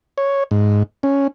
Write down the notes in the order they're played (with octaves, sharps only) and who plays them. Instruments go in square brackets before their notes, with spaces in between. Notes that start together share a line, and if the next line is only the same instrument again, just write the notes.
[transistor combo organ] C#5
G#2
C#4